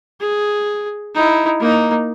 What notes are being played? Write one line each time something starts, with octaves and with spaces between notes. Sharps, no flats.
G#4
D#4 E4
A#3 D#4